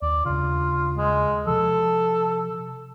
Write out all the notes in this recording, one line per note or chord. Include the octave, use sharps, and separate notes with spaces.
D#2 D5
D#2 C#3 F4
G#3
C3 F3 A4